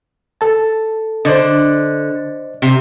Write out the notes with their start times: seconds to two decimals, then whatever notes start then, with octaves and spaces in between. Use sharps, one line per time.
0.41 A4 A5
1.25 D3 C5 D5 D#5
2.62 C3